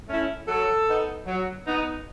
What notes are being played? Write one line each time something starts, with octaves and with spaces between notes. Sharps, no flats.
A3 C#4 E4
F#3 A4
B3 D#4
F#3
B3 D#4